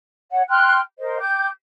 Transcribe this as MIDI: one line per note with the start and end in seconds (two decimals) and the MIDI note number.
0.31 0.42 73
0.31 0.42 78
0.49 0.79 79
0.49 0.79 84
0.49 0.79 89
0.49 0.79 90
0.99 1.18 70
0.99 1.18 72
0.99 1.18 75
1.19 1.47 79
1.19 1.47 86
1.19 1.47 91